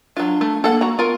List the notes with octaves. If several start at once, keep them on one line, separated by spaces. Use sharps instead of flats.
F#3 D4 F4
A3
A#3 A4 F#5
F#4 A#5
B3 F4 A#4